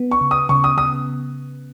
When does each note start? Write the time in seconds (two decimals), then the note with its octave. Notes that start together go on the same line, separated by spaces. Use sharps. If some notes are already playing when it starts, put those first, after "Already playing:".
Already playing: B3
0.11 C#6
0.21 C#3
0.31 D#6
0.49 C#3 C#6
0.64 D#6
0.78 C#3 D#6